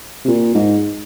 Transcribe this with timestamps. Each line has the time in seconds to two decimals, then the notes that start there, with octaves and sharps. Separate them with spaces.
0.25 C3
0.28 A#2
0.54 G#2